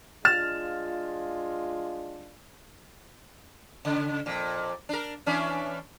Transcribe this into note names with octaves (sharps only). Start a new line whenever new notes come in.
G#3 D4 F4 F6 A6 E7
C#3
F2 A#2
D4 A#4
E3 C#4 D4